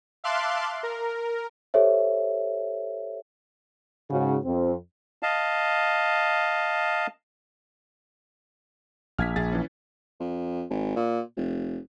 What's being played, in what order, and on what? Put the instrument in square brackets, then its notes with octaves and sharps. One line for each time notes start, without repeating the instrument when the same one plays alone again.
[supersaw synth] E5 F5 A5 C6 D6 F#6
A#4
[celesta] G4 A4 C5 C#5 E5
[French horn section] G#2 C#3 F#4
F2 C4
[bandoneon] D#5 F5 A5
[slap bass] A#1 [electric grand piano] F6 G#6 B6
[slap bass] A#1 [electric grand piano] G#4 A6
[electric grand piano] E3 C#4
[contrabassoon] F2
G#1
A#2
F1